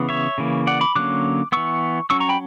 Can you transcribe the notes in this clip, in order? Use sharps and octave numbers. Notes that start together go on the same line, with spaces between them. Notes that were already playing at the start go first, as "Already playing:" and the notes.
Already playing: C#3 E3 B3
C#5 E5
C#3 E3 A#3
D5 F#5
B5 D6
D3 F#3 A#3 C#4 D6 F#6
E3 B3 C#6 E6
F#3 C#4 C#6 E6
A#5 C#6
G5 B5